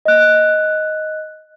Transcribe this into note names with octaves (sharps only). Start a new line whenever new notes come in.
D#5 F#6